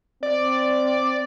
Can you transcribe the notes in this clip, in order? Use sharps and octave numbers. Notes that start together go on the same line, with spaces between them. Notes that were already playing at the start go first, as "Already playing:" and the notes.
C4 D5